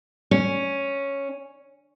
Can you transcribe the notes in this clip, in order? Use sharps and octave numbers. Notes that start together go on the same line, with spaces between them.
C#4